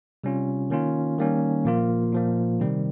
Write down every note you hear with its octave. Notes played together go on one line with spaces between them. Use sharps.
C3 G3 C#4 F4
D#3 A#3 C#4 F4
D#3 G3 A#3 C#4
A#2 F3 A#3 F4
A#2 F3 A#3
C3 D#3 G3 C4